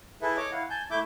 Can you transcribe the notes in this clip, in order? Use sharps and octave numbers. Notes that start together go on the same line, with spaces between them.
E4 G#4 A4 B4 E5
C#5 D#5 D6
E4 F5 F#5
G#5 A5 G6
A3 E4 E5 D6 G6